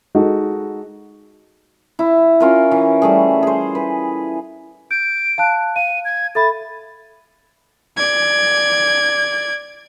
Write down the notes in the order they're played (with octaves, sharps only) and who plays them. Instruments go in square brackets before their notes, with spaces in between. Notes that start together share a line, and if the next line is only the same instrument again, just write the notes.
[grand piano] G#3 D#4 F#4 A4
[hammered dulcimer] E4
C#4 F4 A#4
E3
G3 A3 G#4
G#4 C5
B4
[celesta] G6 [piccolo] D7
[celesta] F5 A5 F#6
[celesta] F5 [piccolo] D#7
[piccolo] G#6
[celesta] A4 E5 B5 [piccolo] A6
[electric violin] D5 G#6